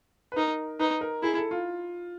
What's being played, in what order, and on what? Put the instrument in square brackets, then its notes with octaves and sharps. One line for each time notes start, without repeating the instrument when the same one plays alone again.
[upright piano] B4
[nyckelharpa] D#4 [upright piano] A#4
[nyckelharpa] D#4 [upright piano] B4
[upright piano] A#4
[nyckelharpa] E4 [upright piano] G#4
[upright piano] A4
F4